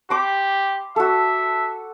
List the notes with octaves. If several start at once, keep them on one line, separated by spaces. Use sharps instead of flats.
G4 C6 D6
F#4 A4 E5